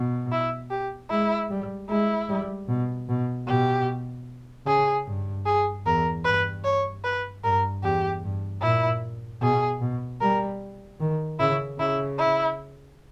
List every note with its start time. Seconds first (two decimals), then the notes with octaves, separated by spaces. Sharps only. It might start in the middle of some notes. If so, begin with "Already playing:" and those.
Already playing: B2
0.32 E4
0.70 G4
1.10 G#3 E4
1.50 G3
1.89 G#3 E4
2.29 G3
2.68 B2
3.09 B2
3.47 B2 G4
4.66 C#3 G#4
5.06 G2
5.46 G#4
5.86 E2 A#4
6.25 G2 B4
6.64 C#5
7.04 B4
7.43 G2 A#4
7.83 E2 G4
8.23 G2
8.62 A#2 E4
9.41 B2 G#4
9.81 B2
10.21 G3 A#4
11.00 D#3
11.39 C#3 E4
11.78 C#3 E4
12.19 E4